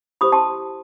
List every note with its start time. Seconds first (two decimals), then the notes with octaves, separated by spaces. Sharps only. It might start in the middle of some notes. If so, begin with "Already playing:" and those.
0.21 E4 G4 C5 B5 D#6
0.32 A5 C6